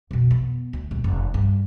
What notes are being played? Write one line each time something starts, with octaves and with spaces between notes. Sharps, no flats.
F2 B2
B3
D2
D#1
F1
G2